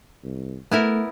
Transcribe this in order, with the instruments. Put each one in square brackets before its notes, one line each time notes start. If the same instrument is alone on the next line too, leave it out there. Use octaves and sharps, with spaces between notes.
[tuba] C2
[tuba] A3 [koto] B3 E4 A#4